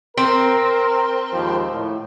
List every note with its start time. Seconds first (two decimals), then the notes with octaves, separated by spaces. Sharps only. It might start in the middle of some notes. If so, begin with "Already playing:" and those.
0.17 C4 A#4
1.33 D#2 G#2 F3
1.72 A2